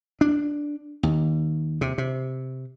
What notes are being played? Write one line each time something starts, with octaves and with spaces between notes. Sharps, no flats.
D4
D#2
C3
C3